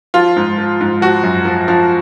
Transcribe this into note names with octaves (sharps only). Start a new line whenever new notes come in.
F3 F4
G#2
F3
G#2
F3 F#4
F#2
F3
F3